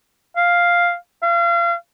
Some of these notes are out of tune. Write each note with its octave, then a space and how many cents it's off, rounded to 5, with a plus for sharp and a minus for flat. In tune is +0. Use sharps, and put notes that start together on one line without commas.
F5 +0
F5 -35